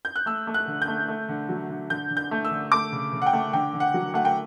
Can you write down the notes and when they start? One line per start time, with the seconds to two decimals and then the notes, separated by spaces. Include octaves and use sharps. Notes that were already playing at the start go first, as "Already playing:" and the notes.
0.05 G6
0.16 F#6
0.26 A3 E6
0.47 A3
0.54 F#6
0.67 D3
0.82 G6
0.88 A3
1.08 A3
1.29 D3
1.49 F#3
1.70 D3
1.90 D3 G6
2.10 D3
2.17 G6
2.31 A3
2.45 E6
2.51 D3
2.72 A3 D6
2.92 C#3
3.13 C#3
3.22 F#5
3.26 G5
3.33 A3
3.53 D3 G5
3.74 D3
3.80 F#5
3.94 F#3
4.14 A3 F#5
4.25 G5